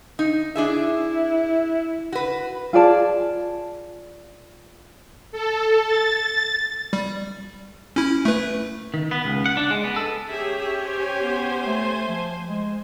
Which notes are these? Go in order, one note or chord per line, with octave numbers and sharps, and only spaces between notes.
D#4
D4 E4 G#4 E5
F#4 B4
F4 G#4 D5 A5
A4
A6
G3
C#4 E4
A3 B4
D#3
B3
C#2
F#5
D4
G#3
B3
A4
C#4 G4 G#4 C#5 E5
C5 G#5
B3
A3
F3
G#3